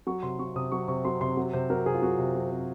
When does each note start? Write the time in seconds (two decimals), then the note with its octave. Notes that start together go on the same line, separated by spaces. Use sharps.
0.07 F#3 C#6
0.23 C3 C6
0.39 F#3 C#6
0.56 C3 D#6
0.72 F#3 C#6
0.88 C3 C#6
1.05 F#3 C6
1.21 C3 C6
1.37 F#3
1.53 C3 C5
1.70 F#3 A#4
1.86 C3 G#4
1.94 F4
2.02 F#3 F#4
2.19 C3
2.35 F#3
2.51 C3